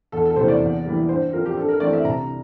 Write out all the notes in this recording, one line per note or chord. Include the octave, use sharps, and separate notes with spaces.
E2 A4
A4
C3 E3 A#3 C5
D5
E2
E3 G3 A#3
G2 C5
F3 C4 A#4
G4
G2 A4
A#4
E3 A3 C4 D5
E5
C2 A#5